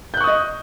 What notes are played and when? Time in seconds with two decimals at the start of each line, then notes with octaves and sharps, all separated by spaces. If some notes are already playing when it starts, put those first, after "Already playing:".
0.14 G6
0.17 F#6
0.21 C#6
0.24 D#6
0.27 D#5